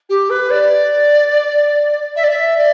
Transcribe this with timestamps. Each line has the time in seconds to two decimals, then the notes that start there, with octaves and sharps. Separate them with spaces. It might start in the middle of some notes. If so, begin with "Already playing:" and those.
0.09 G4
0.29 B4
0.50 D5
2.16 E5
2.23 D5
2.30 E5
2.57 D5